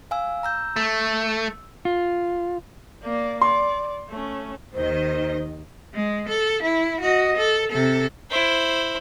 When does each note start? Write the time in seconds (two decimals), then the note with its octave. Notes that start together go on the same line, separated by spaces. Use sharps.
0.11 F5 G#5 E6
0.43 A#5 E6 G6
0.76 A3 E6
1.85 F4
3.03 A#3 D5
3.42 D5 C6
4.09 A3 C#4
4.74 D#2 D#3 C5 D#5
5.95 G#3
6.28 A4
6.62 E4
7.01 F#4 D#5
7.37 A4
7.71 C3 A4
8.30 E4 C5